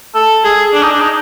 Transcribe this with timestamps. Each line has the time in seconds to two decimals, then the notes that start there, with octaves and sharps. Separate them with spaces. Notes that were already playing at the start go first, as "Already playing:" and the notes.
0.15 A4
0.44 G#4
0.73 D4
0.82 D#4
0.91 D4
1.01 D#4